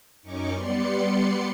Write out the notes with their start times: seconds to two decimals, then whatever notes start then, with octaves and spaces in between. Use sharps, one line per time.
0.23 F#2 C#4 D#4 C#6 D6
0.52 G3 B3 D5 C6 C#7